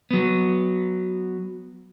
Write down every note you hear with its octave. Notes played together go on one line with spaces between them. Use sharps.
F#3 B3